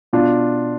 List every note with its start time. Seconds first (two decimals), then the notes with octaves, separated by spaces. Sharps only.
0.13 B2 D4 F4